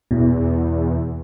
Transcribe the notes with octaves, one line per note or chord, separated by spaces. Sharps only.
E2 B2